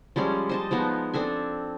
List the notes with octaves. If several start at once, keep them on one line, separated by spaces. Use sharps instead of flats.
F3 G3 G#3 C#4
C5 D#5 A5
F3 G#3 B3 D#4
C4 D4 A4 G#5